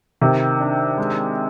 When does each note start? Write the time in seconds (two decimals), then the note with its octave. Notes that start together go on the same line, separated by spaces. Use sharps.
0.21 C3 D#3
0.60 D4
0.98 G#3